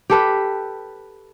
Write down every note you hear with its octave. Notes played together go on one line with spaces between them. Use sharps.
G4 A4 B4